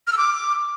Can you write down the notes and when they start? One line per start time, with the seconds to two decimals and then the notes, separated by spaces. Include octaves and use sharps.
0.07 F6
0.12 E6
0.18 D6